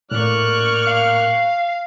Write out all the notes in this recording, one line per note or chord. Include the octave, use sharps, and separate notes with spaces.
A2 A#3 D5 C#6 F6 F#6
F5